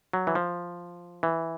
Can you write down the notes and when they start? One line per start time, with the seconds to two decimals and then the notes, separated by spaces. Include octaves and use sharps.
0.13 F#3
0.27 E3
0.35 F3
1.23 E3